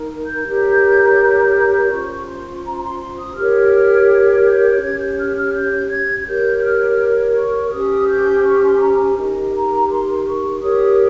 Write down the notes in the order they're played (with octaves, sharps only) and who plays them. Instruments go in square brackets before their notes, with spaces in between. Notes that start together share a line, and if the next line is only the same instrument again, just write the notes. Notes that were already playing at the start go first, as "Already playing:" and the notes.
Already playing: [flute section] D#4 A#4
G6
G4 A#4 C#5
C#4 F4 C5 C#6
C6
A#5
A#5
C6
C6
D#6
G4 A#4 C#5 F6
F6
F6
G6
C#4 G4 C#5 G#6
G6
F6
F6
G6
G#6
G#6
G4 A#4 C#5 G6
F6
C#6
C#4 G4 C5 D#6
G6
C#6
C6
A#5
G#5
D#4 G4 A#4 D#5
A#5
C6
C#6
G4 A#4 C#5 D#6